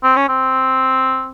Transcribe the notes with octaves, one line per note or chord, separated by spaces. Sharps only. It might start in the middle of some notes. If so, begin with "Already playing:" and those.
C4
C#4
C4